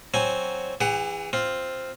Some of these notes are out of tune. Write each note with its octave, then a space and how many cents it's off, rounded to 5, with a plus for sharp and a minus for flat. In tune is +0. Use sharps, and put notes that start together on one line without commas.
F#3 +5 C4 +0 G#5 +0
E3 +10 G#4 -35 F#5 +25
C4 +0 F4 +0